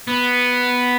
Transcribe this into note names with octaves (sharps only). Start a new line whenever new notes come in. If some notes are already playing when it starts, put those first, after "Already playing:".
B3